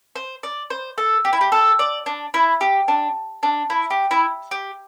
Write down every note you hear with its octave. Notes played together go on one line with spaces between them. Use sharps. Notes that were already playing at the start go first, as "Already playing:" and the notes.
C5
D5
C5
A4
G4
E4
G4
A4
D5
D4
E4
G4
D4
D4
E4
G4
E4
G4